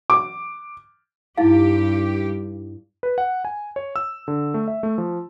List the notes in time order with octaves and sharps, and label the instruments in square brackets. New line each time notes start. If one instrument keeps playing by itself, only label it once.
[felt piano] D6
[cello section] G2 G4 [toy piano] D#4 E4 F5
[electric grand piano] B4
F#5
G#5
C#5
E6
D3
A3
E5
A3
F3